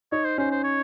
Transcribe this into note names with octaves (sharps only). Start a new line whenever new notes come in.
D#4 C#5
C5
C#4 C5
C5
C#5